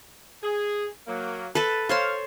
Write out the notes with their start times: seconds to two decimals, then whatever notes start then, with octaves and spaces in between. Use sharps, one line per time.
0.43 G#4
1.06 F#3 A#3
1.55 A4 B4 A5
1.89 C5 C#5 F5 C6